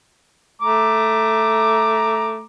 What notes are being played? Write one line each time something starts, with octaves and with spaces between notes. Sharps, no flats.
A3 A#5 D6